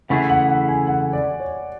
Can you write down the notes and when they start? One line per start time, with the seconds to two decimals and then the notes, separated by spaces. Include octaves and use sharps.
0.09 C#3 E3 A3 E4 G#4 F#5
0.29 F#5
0.49 F#5
0.69 G#5
0.87 F#5
1.13 D5
1.40 C#5